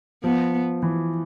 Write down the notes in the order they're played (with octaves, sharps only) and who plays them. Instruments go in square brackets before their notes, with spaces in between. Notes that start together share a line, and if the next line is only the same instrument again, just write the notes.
[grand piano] F3 [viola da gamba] B3
[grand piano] E3